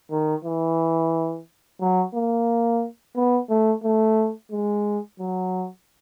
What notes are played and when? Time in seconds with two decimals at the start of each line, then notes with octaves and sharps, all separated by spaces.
0.11 D#3
0.44 E3
1.81 F#3
2.14 A#3
3.16 B3
3.49 A3
3.84 A3
4.51 G#3
5.20 F#3